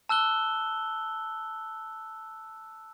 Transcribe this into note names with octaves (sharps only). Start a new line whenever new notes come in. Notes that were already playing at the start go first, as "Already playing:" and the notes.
A5 E6 F#6 G7